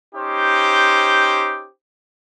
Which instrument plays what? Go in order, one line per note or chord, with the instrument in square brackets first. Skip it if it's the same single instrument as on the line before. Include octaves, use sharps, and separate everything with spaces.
[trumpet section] C#4 D#4 G4 C5